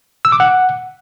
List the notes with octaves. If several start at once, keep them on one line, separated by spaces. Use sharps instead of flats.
E6
D6
F#5